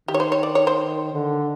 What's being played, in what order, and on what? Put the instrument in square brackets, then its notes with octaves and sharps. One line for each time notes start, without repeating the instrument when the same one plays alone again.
[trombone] D#3 [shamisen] G4
[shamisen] C#5
C5
C#5
D5
C#5
C5
[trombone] D3